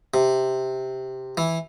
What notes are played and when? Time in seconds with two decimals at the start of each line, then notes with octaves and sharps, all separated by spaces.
0.14 C3
1.37 E3